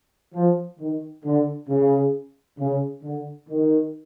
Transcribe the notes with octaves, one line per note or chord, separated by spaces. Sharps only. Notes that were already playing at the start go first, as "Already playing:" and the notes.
F3
D#3
D3
C#3
C#3
D3
D#3